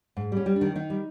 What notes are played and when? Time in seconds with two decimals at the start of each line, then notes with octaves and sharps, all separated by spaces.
0.17 G#2
0.32 G3 C#4
0.46 G3
0.56 D4
0.61 D#3
0.76 D#3 D#4
0.90 G3